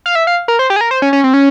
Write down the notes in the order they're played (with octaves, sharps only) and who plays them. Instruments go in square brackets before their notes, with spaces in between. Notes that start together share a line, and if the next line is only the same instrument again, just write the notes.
[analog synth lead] F5
E5
F5
A#4
C5
G4
G#4
A#4
C5
C#4
C#4
C4
C#4